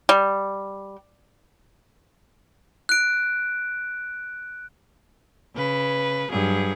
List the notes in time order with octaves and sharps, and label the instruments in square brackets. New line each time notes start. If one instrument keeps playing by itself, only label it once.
[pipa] G3
[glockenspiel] F#6 D7
[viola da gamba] C#3 B4
G2 F#3 G#4